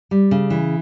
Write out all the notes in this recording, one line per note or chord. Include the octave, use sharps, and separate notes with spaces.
G3
C#3
E3